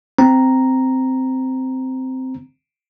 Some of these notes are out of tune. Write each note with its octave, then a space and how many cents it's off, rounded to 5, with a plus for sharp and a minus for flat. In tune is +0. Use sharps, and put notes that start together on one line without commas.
C4 -10 A#5 +0